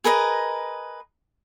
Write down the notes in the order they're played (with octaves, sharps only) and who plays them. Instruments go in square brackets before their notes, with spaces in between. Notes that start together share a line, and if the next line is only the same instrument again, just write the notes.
[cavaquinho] G#4 A#4 B4 D#5